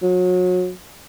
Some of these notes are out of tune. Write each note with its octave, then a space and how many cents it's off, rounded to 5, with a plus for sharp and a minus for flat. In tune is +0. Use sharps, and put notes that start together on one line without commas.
F#3 -30